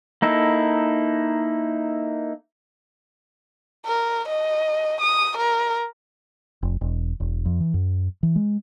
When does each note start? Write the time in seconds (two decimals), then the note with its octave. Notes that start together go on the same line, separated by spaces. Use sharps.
0.22 A#3 D#4 E4 A4
3.86 A#4
4.28 D#5
5.01 D#6
5.37 A#4
6.62 F1
6.81 E1
7.20 E1
7.45 F2
7.60 E3
7.74 F#2
8.23 E3
8.36 G#3